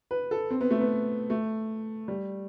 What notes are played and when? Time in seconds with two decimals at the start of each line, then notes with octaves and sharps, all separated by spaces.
0.11 B4
0.31 A4
0.50 C4
0.61 B3
0.71 A3
0.81 B3
1.30 A3
2.08 G3